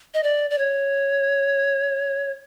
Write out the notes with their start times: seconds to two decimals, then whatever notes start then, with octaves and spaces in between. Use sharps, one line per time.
0.14 D#5
0.23 D5
0.50 D5
0.58 C#5